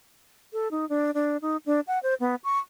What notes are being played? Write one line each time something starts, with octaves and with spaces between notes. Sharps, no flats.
A4
D#4
D4
D4
D#4
D4
F#5
C5
B3
C#6